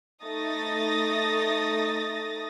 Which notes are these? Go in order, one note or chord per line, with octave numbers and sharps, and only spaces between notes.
A3 D#4 D#6 A6 A#6